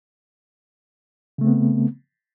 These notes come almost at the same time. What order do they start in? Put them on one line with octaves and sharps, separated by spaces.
C#3 A3 C4 B3